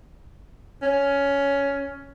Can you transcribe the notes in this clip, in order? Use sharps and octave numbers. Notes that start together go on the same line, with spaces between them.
C#4